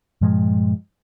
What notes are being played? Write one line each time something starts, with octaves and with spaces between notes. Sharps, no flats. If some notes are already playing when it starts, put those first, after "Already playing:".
G2 A#2 F3 G#3